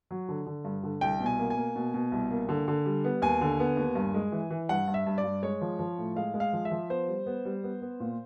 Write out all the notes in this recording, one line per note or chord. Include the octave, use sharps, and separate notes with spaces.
F#3
D3
D3
G2
D3
C2 G5
B2
G#5
A#3
G#5
A#3
B2
B2
C2
A#3
D3
D3
G3
B3
D#2 G#5
D3
B3
D#2
G2
G#3
E3
E3
G2 F#5
G2
E5
G2
D5
G2
G#3 C#5
F3
F3
A2
G#3 F5
G#3
F5
F3
E5
F3
B3 C5
G3
B3
G3
B3
B3
A#2